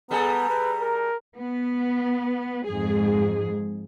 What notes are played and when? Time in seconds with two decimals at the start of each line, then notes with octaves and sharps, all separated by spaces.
0.11 G3 B3 G#4 A4 A#5
0.49 B4
0.81 A#4
1.37 B3
2.67 F2 G#2 G#4